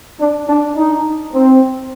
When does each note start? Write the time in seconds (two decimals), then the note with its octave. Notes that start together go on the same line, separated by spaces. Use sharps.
0.20 D4
0.48 D4
0.77 D#4
1.33 C4